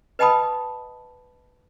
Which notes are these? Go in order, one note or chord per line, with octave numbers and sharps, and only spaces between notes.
B4 D#5 G5 A5 B5 D#6